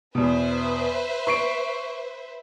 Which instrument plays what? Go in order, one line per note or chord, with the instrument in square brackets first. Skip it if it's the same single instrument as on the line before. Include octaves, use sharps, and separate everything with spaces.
[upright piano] E2 B2 [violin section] B4 C5 E5
[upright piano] C#6 C7 D7